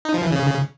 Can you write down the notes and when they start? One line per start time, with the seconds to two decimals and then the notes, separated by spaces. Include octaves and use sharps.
0.05 D#4
0.14 F3
0.23 E3
0.32 C#3